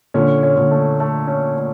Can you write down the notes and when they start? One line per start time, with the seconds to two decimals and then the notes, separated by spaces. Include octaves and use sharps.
0.14 A#2 D3 C#4
0.43 C#4
0.57 A#2 D3
0.71 A3
1.00 A3
1.27 C#4
1.56 A3